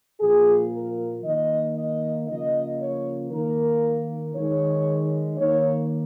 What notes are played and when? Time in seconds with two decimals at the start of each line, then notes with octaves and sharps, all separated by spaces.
0.21 A#2 F3 A#3 G#4
0.73 A#4
1.25 D#3 A#3 D#5
1.77 D#5
2.28 C#3 F3 A#3 D#5
2.79 C#5
3.31 D#3 A#3 A#4
4.35 D#3 G#3 C#5
5.38 D#3 A#3 C#5